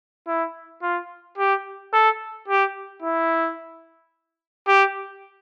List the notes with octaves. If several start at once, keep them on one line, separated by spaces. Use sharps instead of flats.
E4
F4
G4
A4
G4
E4
G4